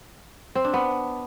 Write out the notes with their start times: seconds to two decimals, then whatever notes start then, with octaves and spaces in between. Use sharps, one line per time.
0.55 C4
0.65 D4
0.74 B3